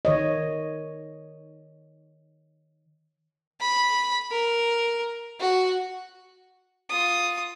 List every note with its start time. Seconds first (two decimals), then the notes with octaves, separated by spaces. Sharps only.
0.05 D#3 C#5 D#5
3.61 B5
4.31 A#4
5.40 F#4
6.89 F4 D#6